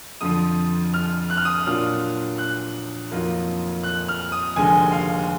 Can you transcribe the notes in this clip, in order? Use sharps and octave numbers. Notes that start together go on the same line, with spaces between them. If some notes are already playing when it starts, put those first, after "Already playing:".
F2 D3 F3 D#6
F6
F#6
F6
D#6
F6
A#2 F#3 D4 F4 F6
F#6
F2 D#3 F#3 A#3 F4
F#6
F6
D#6
F1 D#2 D3 G#3 G#5
F5